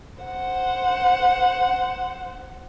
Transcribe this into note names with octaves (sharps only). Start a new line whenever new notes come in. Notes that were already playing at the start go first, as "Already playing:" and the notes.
C5 F#5